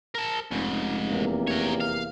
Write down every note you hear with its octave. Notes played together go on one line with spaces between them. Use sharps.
A#4 A5
F1 G#2 C#3
E2 C3 A#3
A#4 C#5
F5